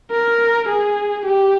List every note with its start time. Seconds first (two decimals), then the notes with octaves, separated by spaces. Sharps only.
0.11 A#4
0.68 G#4
1.25 G4